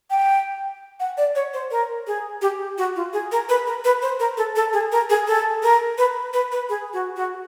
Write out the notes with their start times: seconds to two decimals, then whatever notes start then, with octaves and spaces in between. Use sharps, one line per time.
0.10 G5
1.00 F#5
1.17 D5
1.35 C#5
1.54 C5
1.71 A#4
2.07 G#4
2.42 G4
2.78 F#4
2.96 F4
3.13 G#4
3.32 A#4
3.49 B4
3.67 A#4
3.85 B4
4.02 C5
4.20 A#4
4.37 A4
4.56 A4
4.73 G#4
4.92 A#4
5.10 G#4
5.27 A4
5.63 A#4
5.98 B4
6.33 B4
6.52 B4
6.69 G#4
6.94 F#4
7.16 F#4